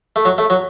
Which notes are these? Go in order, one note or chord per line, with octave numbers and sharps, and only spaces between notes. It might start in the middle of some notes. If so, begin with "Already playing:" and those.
A3
F#3
A3
F#3